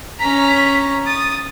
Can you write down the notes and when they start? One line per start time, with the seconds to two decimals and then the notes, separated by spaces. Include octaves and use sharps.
0.20 C#4 A#5 B6
1.06 D#6 A6